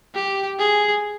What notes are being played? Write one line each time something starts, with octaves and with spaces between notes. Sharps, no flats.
G4
G#4